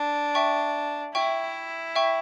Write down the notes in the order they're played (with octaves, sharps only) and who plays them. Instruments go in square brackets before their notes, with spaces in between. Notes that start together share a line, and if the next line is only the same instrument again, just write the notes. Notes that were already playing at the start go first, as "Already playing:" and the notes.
Already playing: [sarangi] D4
[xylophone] E5 G5 C#6
[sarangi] E4 [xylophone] E5 G5 C#6
[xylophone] E5 G5 C#6